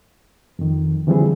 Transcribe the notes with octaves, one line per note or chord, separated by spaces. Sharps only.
F2 D#3
D3 E3 F3 G3 C4 G#4